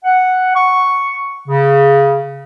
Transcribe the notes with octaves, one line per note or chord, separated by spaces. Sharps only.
F#5
C#6
C#3